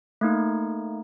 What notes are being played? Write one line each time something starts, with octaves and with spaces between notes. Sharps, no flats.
A3 A#3 D#4